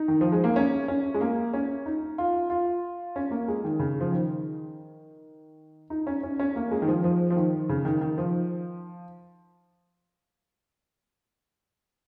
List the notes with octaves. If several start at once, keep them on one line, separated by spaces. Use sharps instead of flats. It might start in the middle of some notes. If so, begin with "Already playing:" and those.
Already playing: D#4
D#3
F3
G#3
A#3
C#4
C#4
G#3
A#3
C#4
D#4
F4
F4
C#4
A#3
G#3
D#3
C#3
F3
D#3
D#4
C#4
C#4
C#4
A#3
G#3
D#3
F3
F3
F3
D#3
C#3
D#3
D#3
F3